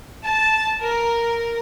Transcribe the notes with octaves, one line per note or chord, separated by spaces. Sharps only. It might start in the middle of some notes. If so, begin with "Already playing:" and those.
A5
A#4